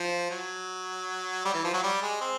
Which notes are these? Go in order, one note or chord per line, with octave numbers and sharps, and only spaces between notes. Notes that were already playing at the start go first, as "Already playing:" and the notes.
Already playing: F3
F#3
G3
E3
F3
F#3
G3
G#3
C4